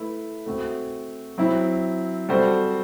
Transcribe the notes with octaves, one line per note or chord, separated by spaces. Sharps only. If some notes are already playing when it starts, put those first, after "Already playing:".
Already playing: A3 E4 B4
A3 C4 F#4
F#3 C4 E4
G3 C4 F#4 A4 C5